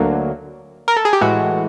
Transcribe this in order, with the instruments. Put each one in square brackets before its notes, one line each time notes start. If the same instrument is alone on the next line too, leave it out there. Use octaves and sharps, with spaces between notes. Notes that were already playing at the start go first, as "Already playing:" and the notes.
Already playing: [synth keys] D2 D3 F#3 A#3
A#4
A4
G#4
G4
A2 E3 G#3 F#4